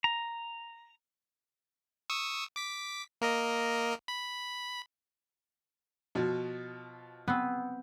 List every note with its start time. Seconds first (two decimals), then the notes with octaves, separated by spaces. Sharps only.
0.04 A#5
2.10 C#6 D#6 E6
2.56 D6 B6
3.21 A#3 A#4 D#5
4.08 B5
6.15 B2 F3 F#4
7.28 B3 C4